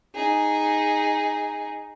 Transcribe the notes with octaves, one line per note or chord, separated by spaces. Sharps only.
D#4 G#4